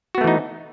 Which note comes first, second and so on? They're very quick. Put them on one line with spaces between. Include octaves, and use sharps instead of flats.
F#4 B3 A3 E3 D#4